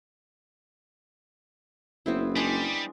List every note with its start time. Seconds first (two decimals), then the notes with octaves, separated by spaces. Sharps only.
2.06 F#1 B3 C4 E4
2.36 G3 G#3 D4 G#4